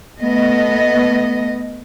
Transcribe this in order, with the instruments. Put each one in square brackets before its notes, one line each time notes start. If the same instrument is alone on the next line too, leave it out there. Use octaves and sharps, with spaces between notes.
[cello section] A3 B3 D#5